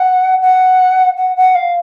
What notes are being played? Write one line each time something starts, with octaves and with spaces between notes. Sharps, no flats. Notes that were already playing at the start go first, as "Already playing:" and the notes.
Already playing: F#5
F#5
F#5
F#5
F5